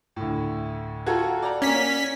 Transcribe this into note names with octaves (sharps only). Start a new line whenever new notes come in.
D2 A2
F4 F#4 A4 G5 A#5 G#6
D5 G5 A#5
A#3 C#4 D5 B6